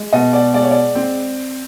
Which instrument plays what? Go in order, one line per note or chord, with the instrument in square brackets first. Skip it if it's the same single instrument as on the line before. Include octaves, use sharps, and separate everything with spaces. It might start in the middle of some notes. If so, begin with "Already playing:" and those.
Already playing: [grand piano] G#3
[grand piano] B2 [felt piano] D#5
[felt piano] D5
[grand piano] G#3 [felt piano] D5
[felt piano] C#5
D5
[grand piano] C4